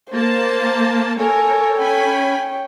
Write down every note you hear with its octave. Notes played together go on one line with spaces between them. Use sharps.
A#3 C5 A5
A4 A#4 C#5 G#5
C#4 C#5 G5 G#5 B5